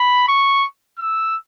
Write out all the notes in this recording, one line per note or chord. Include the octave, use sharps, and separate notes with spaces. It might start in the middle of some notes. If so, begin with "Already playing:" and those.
Already playing: B5
C#6
E6